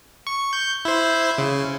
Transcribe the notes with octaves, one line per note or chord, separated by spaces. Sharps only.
C#6
G6
E4 C5
C#3